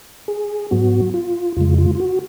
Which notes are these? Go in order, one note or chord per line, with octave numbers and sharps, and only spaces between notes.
G#4
G#2 F#3 B3 F#4
F4
F2 C#3 G#3 F4
F4
F4
F#4